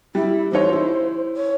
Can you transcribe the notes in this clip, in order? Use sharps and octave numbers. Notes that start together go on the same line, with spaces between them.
G3 E4
E3 D#4 C5 C#5
E4
C#5